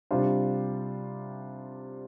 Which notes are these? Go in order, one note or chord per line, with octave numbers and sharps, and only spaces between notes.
C3 G3 D4 F4 C5